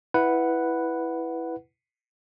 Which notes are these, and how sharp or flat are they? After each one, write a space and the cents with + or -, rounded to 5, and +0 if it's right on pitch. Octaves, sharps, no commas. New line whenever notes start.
E4 +0 B4 +0 F#5 +0